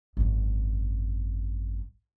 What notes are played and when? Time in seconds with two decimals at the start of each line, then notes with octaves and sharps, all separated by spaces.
0.17 G#1 F#2